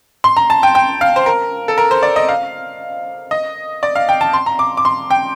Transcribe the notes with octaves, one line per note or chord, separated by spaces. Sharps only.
C6
A#5
A5
G5
G5
F5
C5
A#4
A4
A#4
C5
D5
D#5
F5
D#5
D5
F5
G5
A5
C6
A#5
D6
D6
C6
G5